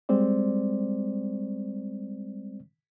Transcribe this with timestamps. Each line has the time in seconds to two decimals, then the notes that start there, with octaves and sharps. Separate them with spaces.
0.09 G3 G#3 C4 C5 D5